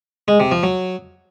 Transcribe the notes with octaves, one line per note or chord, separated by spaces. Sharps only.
G#3
C3
F3
F#3